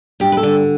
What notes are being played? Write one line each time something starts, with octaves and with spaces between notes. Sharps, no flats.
G2 G4
B4
A4
D3